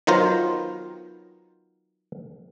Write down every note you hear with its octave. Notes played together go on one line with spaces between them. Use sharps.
D#3 F#3 B3 F4 A#4 C5